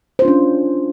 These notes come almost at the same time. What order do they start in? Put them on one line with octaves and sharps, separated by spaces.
C5 F4 D4 C#4